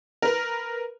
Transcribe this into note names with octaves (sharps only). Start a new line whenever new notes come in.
A#4 B4